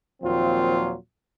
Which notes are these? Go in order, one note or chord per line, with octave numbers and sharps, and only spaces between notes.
D#2 A#2 F3 F#3 C4 F4